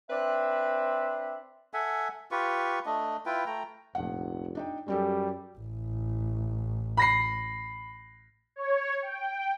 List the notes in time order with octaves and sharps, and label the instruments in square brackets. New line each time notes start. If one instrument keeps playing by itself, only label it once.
[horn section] C4 D4 B4 E5
[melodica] A4 E5 F#5 G#5
F4 G4 B4 C#6
A3 D4 D#5
E4 F4 B4 G5
A3 G5 A#5
[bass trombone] F1 [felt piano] A#1 F#5
[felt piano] D4 D#4 G5
[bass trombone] F#2 [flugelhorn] G3 [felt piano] C#4 G4 A4
[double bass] A1
[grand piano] B5 A#6 C7
[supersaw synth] C#5
G5